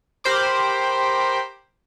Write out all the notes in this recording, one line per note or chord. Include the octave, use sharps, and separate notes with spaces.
G4 A#4 C5 B5 D6